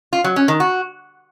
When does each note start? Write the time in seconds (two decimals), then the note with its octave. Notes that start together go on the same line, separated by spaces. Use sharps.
0.13 F4
0.24 F#3
0.36 C#4
0.48 D#3
0.60 F#4